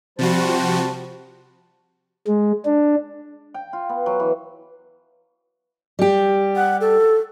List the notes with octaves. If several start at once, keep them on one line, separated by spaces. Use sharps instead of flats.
C3 F3 G3 F#4 C5 A5
G#3
D4
G5
F4
B3
F#3
E3
G3 G4
F#5
A4